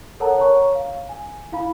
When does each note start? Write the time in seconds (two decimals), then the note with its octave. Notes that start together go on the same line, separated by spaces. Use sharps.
0.20 A4 A#4 C#5 F#5 A5 A#5
0.38 C#5 A#5 C#6
0.75 F5
1.09 G#5
1.52 E4 F5 B5